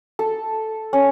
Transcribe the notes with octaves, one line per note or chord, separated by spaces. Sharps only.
A4
C#4